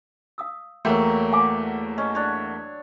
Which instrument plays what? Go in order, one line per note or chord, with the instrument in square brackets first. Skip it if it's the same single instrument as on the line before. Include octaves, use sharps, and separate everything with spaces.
[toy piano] F5 D#6 E6
[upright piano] E2 A3 A#3 [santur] F#3 G5
[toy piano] F5 G#5 D6
[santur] C#4 [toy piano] D#5
[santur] D4 C#5